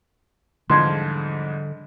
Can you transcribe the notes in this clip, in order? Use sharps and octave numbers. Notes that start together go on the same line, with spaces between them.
E2 G#2 D3 F3 G3 D4 C6 G#6